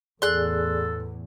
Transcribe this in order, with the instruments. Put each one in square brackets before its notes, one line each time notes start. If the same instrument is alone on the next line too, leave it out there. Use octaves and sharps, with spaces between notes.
[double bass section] E2 A2 [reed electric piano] G#4 D5 [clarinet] A4 [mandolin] C6 F#6